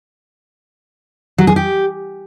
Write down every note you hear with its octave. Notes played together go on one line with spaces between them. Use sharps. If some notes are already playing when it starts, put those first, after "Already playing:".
F#3
G#4
G4